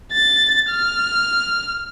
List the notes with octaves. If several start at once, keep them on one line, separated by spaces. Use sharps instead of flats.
A6
F6